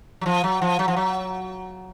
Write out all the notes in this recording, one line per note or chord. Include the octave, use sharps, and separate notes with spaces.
F#3
F3
F#3
F3
F#3
F3
F#3